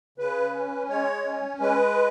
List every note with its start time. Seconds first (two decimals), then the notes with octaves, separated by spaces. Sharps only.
0.18 C#3 B4
0.53 C#4
0.89 G#3 C#5
1.25 C#4
1.60 G#3 B4